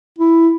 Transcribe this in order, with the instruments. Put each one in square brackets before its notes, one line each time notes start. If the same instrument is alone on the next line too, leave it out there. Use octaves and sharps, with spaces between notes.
[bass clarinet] E4